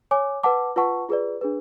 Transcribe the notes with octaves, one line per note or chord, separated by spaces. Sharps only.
C#5 G#5 D6
B4 F#5 A5 D6
F4 B4 F#5 A5 C#6
F4 G#4 B4 D5
D4 G#4 B4